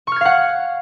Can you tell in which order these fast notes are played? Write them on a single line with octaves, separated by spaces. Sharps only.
C#6 F6 G#6 F5 F#5